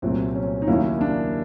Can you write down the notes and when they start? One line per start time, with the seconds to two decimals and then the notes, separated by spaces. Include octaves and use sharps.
0.02 C2 A#2 F#3 A3 C4
0.35 C#4
0.62 D#4
0.67 D#2 C#3 F#3 A#3 E4
1.01 D4